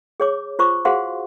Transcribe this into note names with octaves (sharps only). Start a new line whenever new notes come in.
G#4 C#5 D6
F4 C5 C#6 D6
F#4 G#4 C5 F5 F#5 C6